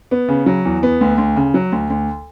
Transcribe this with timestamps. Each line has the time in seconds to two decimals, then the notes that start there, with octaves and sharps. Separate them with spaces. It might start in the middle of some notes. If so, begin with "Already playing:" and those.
0.11 B3
0.28 C#3
0.46 F#3
0.65 E2
0.83 B3
1.01 D2
1.18 D2
1.36 C#3
1.54 F#3
1.72 D2
1.90 D2